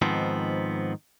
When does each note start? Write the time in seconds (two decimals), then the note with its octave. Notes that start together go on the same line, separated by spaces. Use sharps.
0.02 G#2 D#3 F3 B3 C4